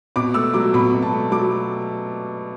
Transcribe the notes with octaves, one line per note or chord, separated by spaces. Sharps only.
B2 D6
A3 E6
F#3 D6
B2 B5
B2
A5
A3
F#3 D6